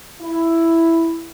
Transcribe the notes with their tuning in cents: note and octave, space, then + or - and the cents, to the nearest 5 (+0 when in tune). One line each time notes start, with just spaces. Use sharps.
E4 +5